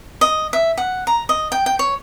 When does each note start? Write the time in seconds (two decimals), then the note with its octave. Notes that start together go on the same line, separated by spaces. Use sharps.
0.21 D#5
0.53 E5
0.78 F#5
1.07 A#5
1.29 D#5
1.52 G5
1.66 G5
1.79 C#5